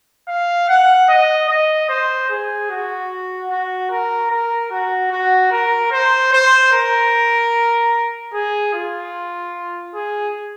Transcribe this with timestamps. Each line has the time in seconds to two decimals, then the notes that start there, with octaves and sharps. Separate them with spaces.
0.28 F5
0.69 F#5
1.09 D#5
1.49 D#5
1.89 C5
2.30 G#4
2.70 F#4
3.50 F#4
3.91 A#4
4.31 A#4
4.71 F#4
5.11 F#4
5.52 A#4
5.92 C5
6.33 C5
6.73 A#4
8.33 G#4
8.74 F4
9.95 G#4